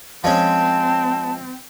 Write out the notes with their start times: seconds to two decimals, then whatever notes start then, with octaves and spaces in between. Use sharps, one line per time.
0.24 F3 G#3 C4 C#4 A5